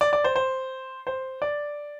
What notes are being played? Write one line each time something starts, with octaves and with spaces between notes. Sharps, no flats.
D5
D5
C5
C5
C5
D5